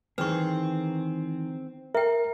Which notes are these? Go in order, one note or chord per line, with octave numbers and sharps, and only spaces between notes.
D#3 E3 C4 G#4 B4 C#6
A#4 E5 G5